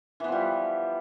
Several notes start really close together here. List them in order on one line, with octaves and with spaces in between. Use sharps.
E3 B3 F3 G3